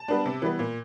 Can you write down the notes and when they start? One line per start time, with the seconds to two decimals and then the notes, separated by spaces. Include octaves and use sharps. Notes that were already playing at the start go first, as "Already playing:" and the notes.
Already playing: A5
0.08 G3 B3 D4
0.26 C3
0.42 E3 G3 B3
0.59 A#2